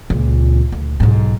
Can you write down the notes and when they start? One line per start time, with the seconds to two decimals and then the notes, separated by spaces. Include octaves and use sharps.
0.10 C#2 A#2
0.72 D2
1.00 B1 G#2